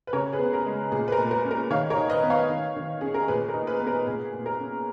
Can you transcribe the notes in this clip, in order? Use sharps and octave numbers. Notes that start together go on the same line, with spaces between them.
B4
C#3 A#4 C#5
G#4 B4
B3
A#4
G#3
A#2 G#4
B4
A#4
A#2
A#4
C#4
A#4
D#3 C#5 F5
A#4 C#5
D#4
B4 D#5
B3
C#5 F5
D#3
D#3
C#4 G#4
A#4
A#2 G#4 B4
A#4
D#4
G#4 B4
B3
A#4
A#2 G#4
A#2
A#4
C#4